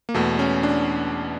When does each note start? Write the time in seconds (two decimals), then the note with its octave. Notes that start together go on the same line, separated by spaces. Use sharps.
0.09 A#3
0.14 E2 B2 A3
0.39 C#4
0.63 D4